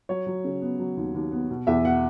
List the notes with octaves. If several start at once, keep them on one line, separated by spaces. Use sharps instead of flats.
F#3 C#5
F#3
C#3
B3
F#3
D#2
D#2
B3
B2
E2 E5
B2 F#5